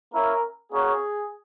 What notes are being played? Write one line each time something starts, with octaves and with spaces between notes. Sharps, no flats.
A#3 C#4 E4 A#4
A#3 C#4 F#4 G#4